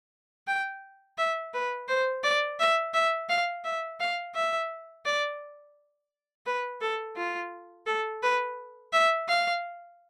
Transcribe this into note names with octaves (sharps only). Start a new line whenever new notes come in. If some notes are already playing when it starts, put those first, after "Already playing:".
G5
E5
B4
C5
D5
E5
E5
F5
E5
F5
E5
D5
B4
A4
F4
A4
B4
E5
F5